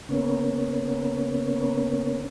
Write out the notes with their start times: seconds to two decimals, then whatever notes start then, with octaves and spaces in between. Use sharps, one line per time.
0.09 C#3 A#3 B3 C#4